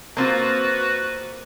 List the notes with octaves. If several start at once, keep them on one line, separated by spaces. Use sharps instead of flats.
A#3 C4 F4 F#4 B4